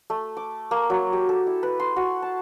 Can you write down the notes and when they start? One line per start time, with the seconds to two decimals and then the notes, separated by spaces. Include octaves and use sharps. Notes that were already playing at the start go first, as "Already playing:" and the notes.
0.10 A3
0.37 D6
0.71 A#3
0.90 F#3
1.13 G4
1.29 A4
1.47 E4
1.63 B4
1.80 C6
1.96 F#4
2.22 A5